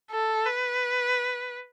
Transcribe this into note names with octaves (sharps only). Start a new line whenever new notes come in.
A4
B4